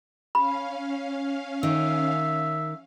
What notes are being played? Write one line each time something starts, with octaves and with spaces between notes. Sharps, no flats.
C#4 F5 B5
D#3 E5